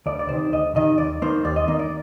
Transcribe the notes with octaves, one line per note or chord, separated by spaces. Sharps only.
D2 D5
D5
C3 D#3 C5
D2 D#5
C3 D#3 D#5
D#2 D5
D#3 A#3 C5
D#2 D5
D#5
D#3 A#3 D#5
D5